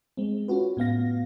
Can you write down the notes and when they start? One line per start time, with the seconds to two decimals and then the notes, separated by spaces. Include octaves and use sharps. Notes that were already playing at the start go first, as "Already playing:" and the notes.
0.17 G#3 C4
0.48 C#4 F4 F#4 B4
0.77 A2 B3 F5 A#6